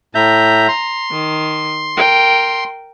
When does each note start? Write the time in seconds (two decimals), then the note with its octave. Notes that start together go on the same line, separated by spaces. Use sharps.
0.15 A2 E5 A#5 G6
0.68 C6
1.11 D#3
1.97 A#4 G5